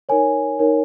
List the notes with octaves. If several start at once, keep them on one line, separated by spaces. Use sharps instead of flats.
D#4 A#4 C#5 G#5
D#4 A#4 C#5